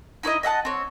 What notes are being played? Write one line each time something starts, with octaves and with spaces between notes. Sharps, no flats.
D#4 E4 C#5 D#5
D#5 E5 F#5 A5
C4 C#5